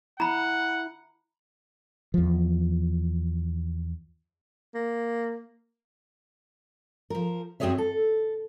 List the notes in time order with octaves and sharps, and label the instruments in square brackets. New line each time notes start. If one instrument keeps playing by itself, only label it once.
[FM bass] E4 [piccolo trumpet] F#5 [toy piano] A#5 B5
[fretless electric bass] E2 F3
[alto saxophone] A#3
[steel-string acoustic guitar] F3 A#4
F#2 C4 F#4 G#4 C#5 E5
A4